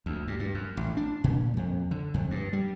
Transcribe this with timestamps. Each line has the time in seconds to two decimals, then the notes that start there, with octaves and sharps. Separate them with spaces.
0.06 D2
0.27 G2
0.40 G2
0.54 F#2
0.77 A1
0.97 D4
1.24 A#2
1.57 F2
1.91 D3
2.14 F2
2.31 G2
2.53 G3